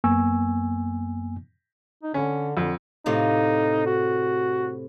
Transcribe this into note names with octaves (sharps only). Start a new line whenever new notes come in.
F#2 A#3 B3 G#5 C#6 E6
D#4
D3 C#4
F2 D3
A2 C3 D#4 F4
F#4